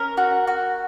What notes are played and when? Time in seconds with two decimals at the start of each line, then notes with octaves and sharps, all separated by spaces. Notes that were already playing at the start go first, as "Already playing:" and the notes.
Already playing: C#4 A#4
0.17 F#4
0.47 F#4